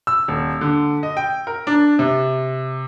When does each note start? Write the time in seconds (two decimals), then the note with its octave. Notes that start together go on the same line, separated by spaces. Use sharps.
0.07 E6
0.28 D#1
0.61 D3
1.03 D#5
1.17 G5
1.47 A#4
1.67 D4
1.99 C3